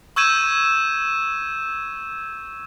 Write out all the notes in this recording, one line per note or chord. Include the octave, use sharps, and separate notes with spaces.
C#6 E6 G6 G#6 D#7 E7